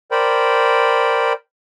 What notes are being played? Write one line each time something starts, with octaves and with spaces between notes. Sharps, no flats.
A#4 C5 D5 G5 B5